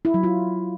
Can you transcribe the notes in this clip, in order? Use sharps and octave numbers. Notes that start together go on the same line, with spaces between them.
E4
F#3
F4